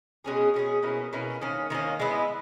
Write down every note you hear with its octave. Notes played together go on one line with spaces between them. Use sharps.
B2 G#3 C#4 G#4
B2 G#3 C#4 G#4
B2 A#3 C#4 E4
B2 A#3 C#4 E4
D#3 A#3 C#4
D#3 A#3 C#4
G#3 B3 E4